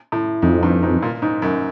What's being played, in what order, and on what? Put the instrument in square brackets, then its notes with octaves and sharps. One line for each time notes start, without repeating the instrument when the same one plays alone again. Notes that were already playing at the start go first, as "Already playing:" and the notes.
[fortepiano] A2
[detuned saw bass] F2 [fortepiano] G#2
[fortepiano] G2
G#2
A#2
G#2
F#2